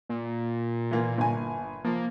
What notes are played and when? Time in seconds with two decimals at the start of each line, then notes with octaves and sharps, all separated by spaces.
0.09 A#2
0.91 E3 A#3 F4
1.18 G1 G#5
1.85 F3 A#3